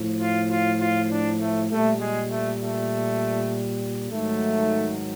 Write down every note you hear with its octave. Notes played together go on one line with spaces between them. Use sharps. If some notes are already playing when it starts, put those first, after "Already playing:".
Already playing: A2 F3
F4
F4
F4
D4
A3
A#2 G3 A3
G#3
A3
A3
G#2 D#3 F#3 A3